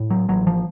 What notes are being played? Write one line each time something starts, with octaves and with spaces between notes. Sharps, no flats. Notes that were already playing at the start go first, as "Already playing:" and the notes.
Already playing: A2
F#3
A1 F#3
F3